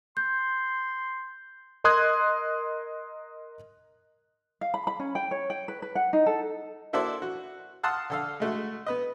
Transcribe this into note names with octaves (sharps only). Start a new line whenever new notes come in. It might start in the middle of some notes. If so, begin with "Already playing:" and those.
C6 G6
A#4 D#5 C6 D#6 F#6 G#6
F5
B5
B5
C#4
G5
C#5
G5
B4
B4
F#5
D#4
A4
A#3 E4 F#4 A4 C5 D5
F#4
F5 F#5 A5 C6 D#6 E6
D3 A4 F5
G#3 A3 F#4
B3 B4 D#5